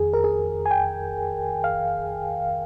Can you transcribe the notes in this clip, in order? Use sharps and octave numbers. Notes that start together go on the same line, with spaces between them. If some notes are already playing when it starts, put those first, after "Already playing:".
Already playing: F2 D#3 G#4
A#4
G#4
G#5
G5
F5